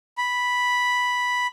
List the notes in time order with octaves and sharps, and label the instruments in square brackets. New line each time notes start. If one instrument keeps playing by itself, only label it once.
[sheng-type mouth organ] B5